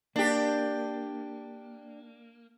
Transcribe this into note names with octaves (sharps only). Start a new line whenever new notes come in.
A#3 D4 G4